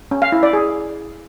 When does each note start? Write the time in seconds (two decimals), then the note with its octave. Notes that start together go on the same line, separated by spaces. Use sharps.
0.11 C#4
0.22 F5
0.32 E4
0.43 D5
0.53 G#4